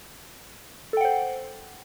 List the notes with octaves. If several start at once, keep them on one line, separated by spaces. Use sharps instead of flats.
A4 C5 F#5 G5